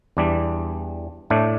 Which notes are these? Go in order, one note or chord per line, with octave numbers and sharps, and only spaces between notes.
E2 E3 G3 D4
A2 A3 D4